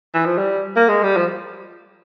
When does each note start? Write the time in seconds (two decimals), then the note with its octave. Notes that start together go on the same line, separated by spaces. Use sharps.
0.14 E3
0.25 F3
0.38 G3
0.76 A#3
0.89 G#3
1.03 G3
1.17 F3